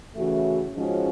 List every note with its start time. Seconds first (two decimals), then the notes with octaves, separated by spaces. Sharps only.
0.16 C#3 E3 A3 C#4 F#4
0.73 G#2 F3 G#3 C#4 F#4